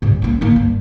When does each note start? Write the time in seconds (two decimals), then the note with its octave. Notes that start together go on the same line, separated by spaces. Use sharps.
0.02 G2 C3
0.22 A#3 C#4
0.41 D#3 A#3
0.56 G2